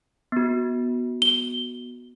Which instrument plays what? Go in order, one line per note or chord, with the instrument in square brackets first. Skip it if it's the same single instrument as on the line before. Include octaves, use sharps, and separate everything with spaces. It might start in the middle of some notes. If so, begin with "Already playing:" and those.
[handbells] B3 F#4
[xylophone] G7